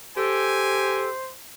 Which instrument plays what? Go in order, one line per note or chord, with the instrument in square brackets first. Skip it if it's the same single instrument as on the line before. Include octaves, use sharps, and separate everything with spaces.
[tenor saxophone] G4 [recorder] A4 [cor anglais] C5 [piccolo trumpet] G#5